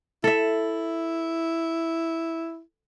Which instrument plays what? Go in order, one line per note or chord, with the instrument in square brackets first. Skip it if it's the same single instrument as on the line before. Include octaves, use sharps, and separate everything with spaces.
[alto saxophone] E4 [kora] A4 E5